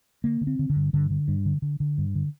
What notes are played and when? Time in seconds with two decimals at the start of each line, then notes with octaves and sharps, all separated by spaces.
0.24 D3 A#3
0.41 D3
0.47 C4
0.59 D3
0.70 D3
0.76 G2
0.93 G2 D3
1.11 D3
1.28 G2
1.46 D3
1.62 D3
1.80 D3
1.98 G2
2.15 D3